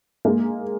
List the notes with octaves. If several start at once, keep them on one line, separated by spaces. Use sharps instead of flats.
G#3 A#3